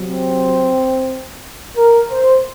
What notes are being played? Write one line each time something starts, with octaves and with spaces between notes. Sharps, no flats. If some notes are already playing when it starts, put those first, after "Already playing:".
Already playing: C3 F#3
C4
A#4
C5